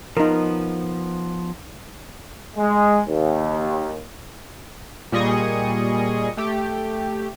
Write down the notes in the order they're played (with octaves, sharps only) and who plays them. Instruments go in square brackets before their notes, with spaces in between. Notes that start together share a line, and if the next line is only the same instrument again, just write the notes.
[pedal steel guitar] F3 B3 [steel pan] D#4 A#4
[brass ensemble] G#3
D#2
[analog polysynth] A#2 G3 G#4 D#5 C#6 D#6
A3 G4